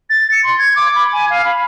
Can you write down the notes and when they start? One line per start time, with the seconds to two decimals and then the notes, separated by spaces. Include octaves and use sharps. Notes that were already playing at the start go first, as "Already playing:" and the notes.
0.10 A6
0.31 C#7
0.44 C6
0.59 G#6
0.76 D6
0.95 B5
1.13 G#5
1.30 F5
1.45 B5